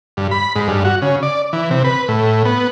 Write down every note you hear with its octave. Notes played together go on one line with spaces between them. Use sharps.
G2
B5
G#2
G2
F#4
C#3
D5
E3
C3
B4
A2
B3